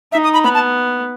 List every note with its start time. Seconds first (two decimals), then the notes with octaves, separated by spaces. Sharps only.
0.12 D#4 E5
0.24 D#6
0.33 B5
0.44 B3 B5
0.54 A5